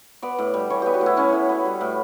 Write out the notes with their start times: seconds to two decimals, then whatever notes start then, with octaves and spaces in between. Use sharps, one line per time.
0.22 B3 D5
0.39 A2
0.54 G3
0.70 E3 C#5
0.82 B3 G4
0.94 F#4
1.01 A2
1.06 E4
1.17 A2 C#4
1.33 A2
1.49 B3
1.65 G3
1.81 A2